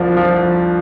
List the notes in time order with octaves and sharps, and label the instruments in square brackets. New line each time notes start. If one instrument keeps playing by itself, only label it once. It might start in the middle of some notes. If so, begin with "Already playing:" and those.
Already playing: [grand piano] C2 F3
F3